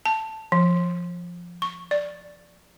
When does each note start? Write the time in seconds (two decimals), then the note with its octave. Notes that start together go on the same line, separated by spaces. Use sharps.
0.06 A5
0.52 F3
1.62 C#6
1.91 D5